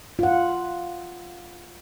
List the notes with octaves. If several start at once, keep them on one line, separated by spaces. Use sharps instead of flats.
F4 F#5